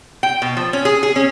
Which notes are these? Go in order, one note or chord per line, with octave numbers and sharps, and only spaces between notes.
G5
B2
F3
C#4
G#4
G#4
C#4